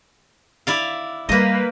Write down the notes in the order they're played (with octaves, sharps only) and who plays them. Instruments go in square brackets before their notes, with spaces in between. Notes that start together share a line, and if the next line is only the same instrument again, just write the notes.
[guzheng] E4 D5 F5
[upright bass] G3 [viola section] A#3 B4 [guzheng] C5 D#5